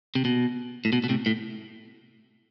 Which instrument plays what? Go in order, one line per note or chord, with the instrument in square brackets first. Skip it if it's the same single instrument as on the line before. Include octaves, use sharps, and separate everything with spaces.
[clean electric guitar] C3
B2
A2
B2
B2
A2 C3
A2